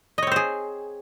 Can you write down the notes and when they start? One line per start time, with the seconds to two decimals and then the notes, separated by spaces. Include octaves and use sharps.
0.18 D#5
0.22 C#5
0.27 C4
0.32 C5
0.36 G#4